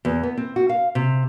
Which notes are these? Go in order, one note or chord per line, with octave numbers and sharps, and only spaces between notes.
E2
B3
C4
F#4
F5
C3